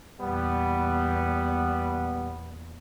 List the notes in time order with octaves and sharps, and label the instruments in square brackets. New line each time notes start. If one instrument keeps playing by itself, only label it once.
[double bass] E2 A#2 [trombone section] G3 B3